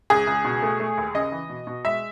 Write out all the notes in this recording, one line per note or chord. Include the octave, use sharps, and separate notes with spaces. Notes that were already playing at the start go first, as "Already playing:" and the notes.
C#2 G#4
C#2
B2
A3
A3
D#2
C#3 D#5
E3
B2
B2
G#3 E5